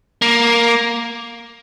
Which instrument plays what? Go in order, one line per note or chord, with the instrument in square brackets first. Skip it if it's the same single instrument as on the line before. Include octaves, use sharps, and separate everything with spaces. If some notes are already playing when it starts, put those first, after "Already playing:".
[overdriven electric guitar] A#3